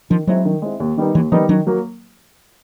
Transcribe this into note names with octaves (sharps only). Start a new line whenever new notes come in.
D#3 F3
F#3 G#3 C4 E4
D#3
G#3 C4 E4
D#2
D#3 G3 B3 D#4
D#2 E3
D#3 F3 G3 B3 D#4
D#3 F#3
F#3 A#3